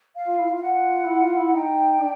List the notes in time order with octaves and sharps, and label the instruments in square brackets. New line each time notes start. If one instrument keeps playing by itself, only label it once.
[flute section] F5
[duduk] F4
E4
[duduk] F4 [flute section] F5
[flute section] F#5
[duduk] E4
F4
E4
[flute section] F#5
[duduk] D#4 [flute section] G5
[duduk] D4